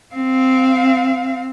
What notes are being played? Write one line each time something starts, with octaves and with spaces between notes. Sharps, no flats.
C4 F5